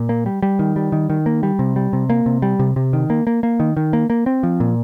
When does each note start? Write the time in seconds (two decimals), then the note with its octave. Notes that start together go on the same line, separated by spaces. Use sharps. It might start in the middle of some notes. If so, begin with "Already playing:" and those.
Already playing: A#2
0.09 A#3
0.26 G3
0.42 G3
0.59 D#3
0.76 G3
0.92 D#3
1.10 D#3
1.26 A#3
1.43 G3
1.59 C3
1.76 G3
1.93 C3
2.10 A#3
2.26 C3
2.42 G3
2.59 C3
2.76 C3
2.93 D#3
3.10 A#3
3.27 A#3
3.43 A#3
3.60 D#3
3.77 D#3
3.93 A#3
4.10 A#3
4.26 C4
4.43 F3
4.60 A#2